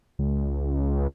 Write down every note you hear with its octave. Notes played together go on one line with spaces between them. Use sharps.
C#2